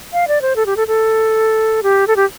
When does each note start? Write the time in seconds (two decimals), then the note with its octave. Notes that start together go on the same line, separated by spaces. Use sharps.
0.13 F5
0.28 D5
0.42 C5
0.56 A4
0.66 G4
0.77 A4
0.88 A4
1.83 G4
2.07 A4
2.16 G4